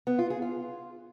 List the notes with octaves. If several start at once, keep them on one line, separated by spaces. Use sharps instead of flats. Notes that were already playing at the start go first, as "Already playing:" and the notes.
B3
F4
G#4
F4